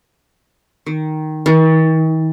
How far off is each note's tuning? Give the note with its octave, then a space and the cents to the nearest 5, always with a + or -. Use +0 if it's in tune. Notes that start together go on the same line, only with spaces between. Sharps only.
D#3 +0
D#3 +45